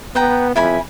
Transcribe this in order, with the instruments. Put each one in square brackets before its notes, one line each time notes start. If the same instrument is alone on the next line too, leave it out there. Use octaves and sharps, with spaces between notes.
[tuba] B3 [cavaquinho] B4 G5 A#5
[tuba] F2 [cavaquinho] E4 G#5 B5